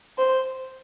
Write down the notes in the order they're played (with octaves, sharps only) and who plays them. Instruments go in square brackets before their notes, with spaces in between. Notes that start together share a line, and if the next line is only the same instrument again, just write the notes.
[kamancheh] C5